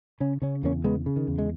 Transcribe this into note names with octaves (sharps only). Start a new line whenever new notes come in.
C#3 C#4
C#3 C#4
E2 A#3 C#4
C#3 G#3 B3
C#3
D#3
E2
G#3